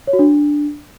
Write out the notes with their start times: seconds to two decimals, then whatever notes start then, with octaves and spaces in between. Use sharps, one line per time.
0.07 C#5
0.13 F#4
0.19 D4